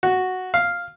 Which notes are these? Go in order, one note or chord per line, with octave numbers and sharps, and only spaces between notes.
F#4
F5